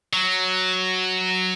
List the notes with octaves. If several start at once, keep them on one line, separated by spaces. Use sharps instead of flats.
F#3